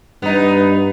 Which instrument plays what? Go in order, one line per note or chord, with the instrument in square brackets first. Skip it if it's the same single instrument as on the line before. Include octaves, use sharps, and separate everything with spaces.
[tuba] G2 [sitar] B3 D#4